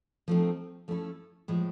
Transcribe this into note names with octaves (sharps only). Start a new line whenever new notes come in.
F3 A3 C4 D#4
F3 A3 C#4 E4 A4
A2 F3 G#3